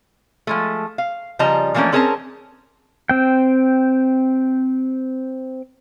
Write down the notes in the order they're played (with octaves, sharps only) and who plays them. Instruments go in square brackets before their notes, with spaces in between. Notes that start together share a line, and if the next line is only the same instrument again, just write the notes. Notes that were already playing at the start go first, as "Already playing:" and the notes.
[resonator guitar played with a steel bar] F3 G#3 A3
F5
C#3 F3 G3 D#5 A5 A#5
E3 F3 A3 A#3 C#4 D4
C4 C#4 G#4 A#4 C#5 A5
[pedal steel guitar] C4 G5